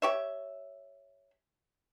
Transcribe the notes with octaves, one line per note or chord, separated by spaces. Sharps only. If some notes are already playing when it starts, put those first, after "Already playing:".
G4 C#5 E5